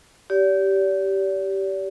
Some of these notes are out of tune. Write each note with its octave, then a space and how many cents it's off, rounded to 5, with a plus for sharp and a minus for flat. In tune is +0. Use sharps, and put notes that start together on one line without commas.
G4 -15 D5 -40